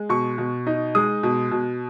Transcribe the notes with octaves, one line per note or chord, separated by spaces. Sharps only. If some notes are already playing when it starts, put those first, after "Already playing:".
Already playing: G#3
B2 C#6
B2
D#4
G#3 D#6
B2
B2